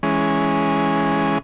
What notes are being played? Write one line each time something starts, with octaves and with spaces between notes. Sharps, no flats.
E3 G#3 C#4